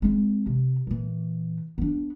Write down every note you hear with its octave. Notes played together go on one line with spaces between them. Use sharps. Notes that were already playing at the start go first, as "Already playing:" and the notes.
G#3 C4
C3
A#2 E3
B3 D4